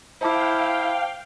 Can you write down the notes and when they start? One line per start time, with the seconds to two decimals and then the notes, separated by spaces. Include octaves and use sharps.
0.21 E4 C5 F5 G5 A5 D6